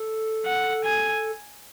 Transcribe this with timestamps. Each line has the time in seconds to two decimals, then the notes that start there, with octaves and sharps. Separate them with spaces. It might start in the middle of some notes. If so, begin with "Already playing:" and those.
Already playing: A4
0.46 F#5
0.84 G#5